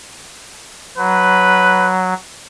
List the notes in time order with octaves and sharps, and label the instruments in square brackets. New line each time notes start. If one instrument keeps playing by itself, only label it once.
[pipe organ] F#3 [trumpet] B4